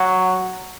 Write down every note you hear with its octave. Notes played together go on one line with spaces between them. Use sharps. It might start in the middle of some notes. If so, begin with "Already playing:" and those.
Already playing: F#3